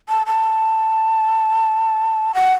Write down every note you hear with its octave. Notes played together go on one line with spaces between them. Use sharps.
A5
A5
F#5